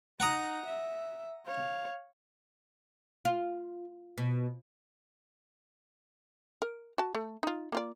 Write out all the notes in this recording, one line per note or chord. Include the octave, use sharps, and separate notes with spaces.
D#4 F#5 A#5 D#6
E5
C#5 F5
F4
B2
A#4
F#4 A5
A3
D#4 F4
A#3 F4 D5